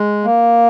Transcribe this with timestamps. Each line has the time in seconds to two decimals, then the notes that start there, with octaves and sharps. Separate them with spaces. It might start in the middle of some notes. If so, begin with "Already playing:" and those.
Already playing: G#3
0.24 A#3